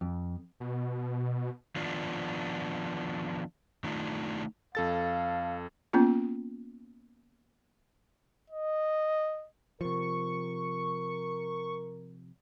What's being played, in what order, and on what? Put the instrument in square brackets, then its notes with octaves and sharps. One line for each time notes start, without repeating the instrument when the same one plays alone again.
[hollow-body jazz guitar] F2
[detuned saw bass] B2
[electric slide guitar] D#3 F3 B3 D4 F4
D#3 A3 D4 D#4 F4
[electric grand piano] F2 A4 A6 [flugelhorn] F5
[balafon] A#3 B3 C#4 F4
[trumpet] D#5
[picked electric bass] C3 F3 [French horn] A#4 [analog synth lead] C#6